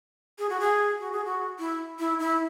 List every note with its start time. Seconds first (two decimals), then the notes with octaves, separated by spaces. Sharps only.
0.39 G#4
0.49 F#4
0.60 G#4
0.99 F#4
1.12 G#4
1.25 F#4
1.59 E4
1.99 E4
2.19 E4